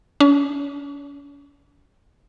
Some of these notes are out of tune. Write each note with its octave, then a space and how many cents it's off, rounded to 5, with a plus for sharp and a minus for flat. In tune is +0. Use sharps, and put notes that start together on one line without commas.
C#4 +40